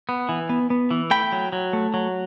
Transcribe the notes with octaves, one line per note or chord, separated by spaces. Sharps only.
B3
E3
B3
B3
E3
A3 G5 B5
F#3
F#3
A3
F#3